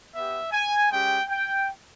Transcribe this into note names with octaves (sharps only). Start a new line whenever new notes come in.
B3 G4 E5
G#5
G#3 C#4 G4 G5
G5